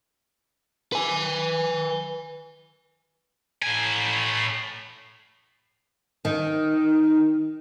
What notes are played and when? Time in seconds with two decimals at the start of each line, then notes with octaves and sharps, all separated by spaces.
0.92 B4 G#5
3.63 A2 G#5
6.25 D#3